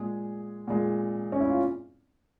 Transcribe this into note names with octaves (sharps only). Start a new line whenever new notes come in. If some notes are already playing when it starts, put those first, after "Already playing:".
Already playing: A#2 G#3 G#4
A#2 G#3
C#4
E4
F4